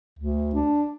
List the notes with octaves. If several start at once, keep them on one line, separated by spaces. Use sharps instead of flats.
D2
D4